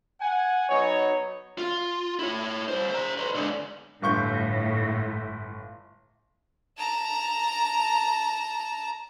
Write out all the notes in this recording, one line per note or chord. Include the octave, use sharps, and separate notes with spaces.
F#5 G#5
F#3 B3 D#4 C#5
F4
E4 C#5
G3 C5
C5 A#5
B4 C#5
G#2 D3
G1 A2 C#6 G6
A5 A#5